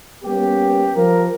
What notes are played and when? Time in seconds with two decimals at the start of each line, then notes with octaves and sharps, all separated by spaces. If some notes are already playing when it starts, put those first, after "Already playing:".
0.24 G3 A#3 B3 C#4 G4
0.96 F3 A#4